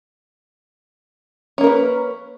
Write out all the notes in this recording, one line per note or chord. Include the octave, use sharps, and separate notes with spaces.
A#3 C#4 A#4 B4